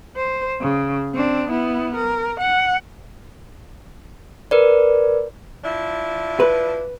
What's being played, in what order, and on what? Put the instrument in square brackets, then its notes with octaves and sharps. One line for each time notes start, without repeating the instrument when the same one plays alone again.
[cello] C5
C#3
C4 D4
B3 E4
A#4
F#5
[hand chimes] A#4 B4 D5
[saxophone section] F3 D4 E4
[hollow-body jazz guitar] B4